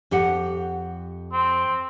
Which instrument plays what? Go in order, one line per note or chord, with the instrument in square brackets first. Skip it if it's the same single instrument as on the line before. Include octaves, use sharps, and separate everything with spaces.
[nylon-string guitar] F2 G4 F#5
[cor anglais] C4